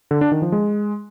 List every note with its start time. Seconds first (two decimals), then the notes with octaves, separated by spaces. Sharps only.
0.11 D3
0.21 D4
0.32 D#3
0.42 F3
0.52 G#3